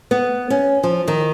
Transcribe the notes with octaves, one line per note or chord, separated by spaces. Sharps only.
B3
C#4
F3
D#3